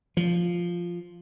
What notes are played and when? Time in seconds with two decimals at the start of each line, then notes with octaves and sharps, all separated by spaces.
0.17 F3